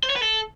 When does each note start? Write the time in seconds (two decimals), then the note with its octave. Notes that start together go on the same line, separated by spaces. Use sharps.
0.03 C5
0.10 C#5
0.16 B4
0.22 A4